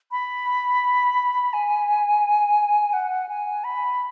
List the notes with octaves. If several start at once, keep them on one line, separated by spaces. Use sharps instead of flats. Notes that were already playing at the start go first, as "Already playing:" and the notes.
B5
G#5
F#5
G#5
B5